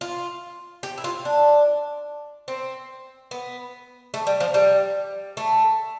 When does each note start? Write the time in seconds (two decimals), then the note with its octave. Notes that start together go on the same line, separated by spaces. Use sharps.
0.01 F4
0.83 G4
0.98 E4
1.04 F4
1.25 D4
2.48 C4
3.31 B3
4.14 A3
4.27 G3
4.40 F3
4.54 G3
5.37 A3